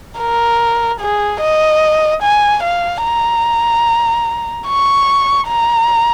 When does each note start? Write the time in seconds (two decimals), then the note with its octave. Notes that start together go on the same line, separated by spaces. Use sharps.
0.19 A#4
1.00 G#4
1.40 D#5
2.23 G#5
2.63 F5
3.04 A#5
4.67 C#6
5.48 A#5